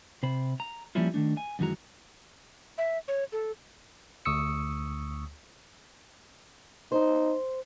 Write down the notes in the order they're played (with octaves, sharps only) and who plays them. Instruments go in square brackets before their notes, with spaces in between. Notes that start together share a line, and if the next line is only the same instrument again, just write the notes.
[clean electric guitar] C3 C5 B5
A#5
F3 G3 A#3 C#4 E4 F4
D#3 F3 A3 D4
G#5
F#2 D#3 E3 G#3 F#4 A#5
[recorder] E5
C#5
A4
[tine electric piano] D2 C#6 D#6 E6 C#7
[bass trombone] D#4 [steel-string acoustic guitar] C5